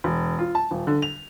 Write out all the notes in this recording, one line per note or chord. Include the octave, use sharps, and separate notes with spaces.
E1
F4
A5
D#1
D3
F7